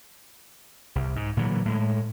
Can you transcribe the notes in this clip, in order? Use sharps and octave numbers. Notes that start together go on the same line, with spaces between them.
C2
G#2
A#2 D3 E3 F#3
A2 G#3